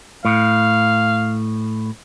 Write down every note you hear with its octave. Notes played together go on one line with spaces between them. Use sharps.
A2 F5